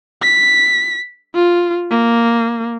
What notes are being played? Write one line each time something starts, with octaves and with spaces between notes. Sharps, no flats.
B6
F4
A#3